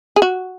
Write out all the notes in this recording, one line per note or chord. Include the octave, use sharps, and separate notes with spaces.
G#4
F#4